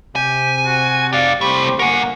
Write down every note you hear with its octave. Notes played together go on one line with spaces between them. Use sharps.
C3 G4 G#5
F#4
G4 D5 F5
C2 C3 A3 G4 C5 B5
G1 A#3 A#4 F#5 G#5 C#6